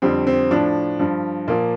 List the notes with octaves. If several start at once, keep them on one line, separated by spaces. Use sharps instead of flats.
F2 D3 G3 C4
C4
A2 F3 D4
G2 F3
A#2 F3 A#3